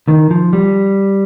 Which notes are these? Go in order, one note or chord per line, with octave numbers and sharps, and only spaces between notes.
D#3
F3
G3